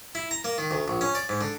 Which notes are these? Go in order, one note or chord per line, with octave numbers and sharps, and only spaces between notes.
E4
A#5
A#3
D#3
D2
A#1
C#4
D5
G#2
D3